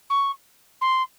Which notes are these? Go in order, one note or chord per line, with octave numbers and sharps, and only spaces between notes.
C#6
C6